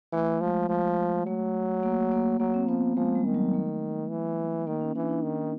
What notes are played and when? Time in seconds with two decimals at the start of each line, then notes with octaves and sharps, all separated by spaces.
0.13 E3 A3
0.41 F3 G#3
0.69 F3
1.26 F#3 A3
1.83 A#3
2.12 A#3
2.40 F#3 A#3
2.54 C4
2.68 F3 B3
2.96 F3 G#3
3.15 G3
3.25 D#3
3.34 F#3
3.54 A3
4.10 E3
4.67 D#3 A#3
4.81 C#4
4.95 E3 D4
5.09 D#4
5.23 D#3